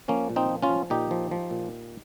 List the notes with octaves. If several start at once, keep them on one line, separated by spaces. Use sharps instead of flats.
F3 A#3 C#4
A#2
C4 D#4
F3
C#4 F4
F3
A#2 D#4 G4
F3
F3
A#2